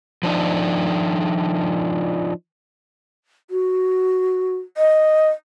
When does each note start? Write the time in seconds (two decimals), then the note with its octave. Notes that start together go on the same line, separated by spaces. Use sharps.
0.23 F3 D4 D#4
3.50 F#4
4.77 D#5